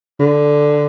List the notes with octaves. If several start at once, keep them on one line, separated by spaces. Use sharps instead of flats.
D3